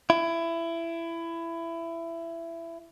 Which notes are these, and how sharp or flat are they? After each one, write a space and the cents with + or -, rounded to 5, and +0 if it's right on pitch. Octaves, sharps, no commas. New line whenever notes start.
E4 +20